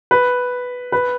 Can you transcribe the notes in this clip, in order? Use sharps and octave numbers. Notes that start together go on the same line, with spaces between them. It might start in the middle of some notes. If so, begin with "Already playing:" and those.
B4
B4